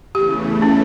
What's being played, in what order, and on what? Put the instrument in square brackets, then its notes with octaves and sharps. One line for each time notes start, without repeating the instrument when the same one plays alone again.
[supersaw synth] E2 C#3 E3 A3 [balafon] G4
[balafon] C#4